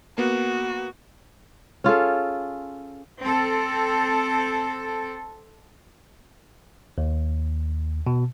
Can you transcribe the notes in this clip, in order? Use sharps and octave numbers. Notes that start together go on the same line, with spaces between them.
A#3 B3 F#4
C#4 F4 G#4 A4
C4 A4
D#2
B2